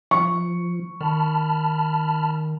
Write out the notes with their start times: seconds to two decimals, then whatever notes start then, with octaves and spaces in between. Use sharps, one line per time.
0.11 F3 C#6
1.01 D#3 A5 B5 F6